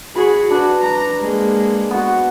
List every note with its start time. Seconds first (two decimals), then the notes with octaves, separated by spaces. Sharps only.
0.16 F#4 G#4 C#5 B5
0.50 D4 F#4 B4
0.83 A#5
1.21 G#3 A#3
1.91 B3 F#4